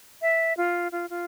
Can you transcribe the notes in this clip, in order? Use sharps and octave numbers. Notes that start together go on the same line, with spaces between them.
E5
F4
F4
F4